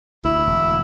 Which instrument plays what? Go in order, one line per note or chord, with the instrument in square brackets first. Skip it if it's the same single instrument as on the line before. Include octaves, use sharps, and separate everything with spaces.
[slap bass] D2 [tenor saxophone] E4
[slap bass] E1